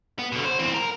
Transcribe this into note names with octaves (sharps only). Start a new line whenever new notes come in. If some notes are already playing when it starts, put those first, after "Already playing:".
B3
B2 D3
C5
E3 C4
A#4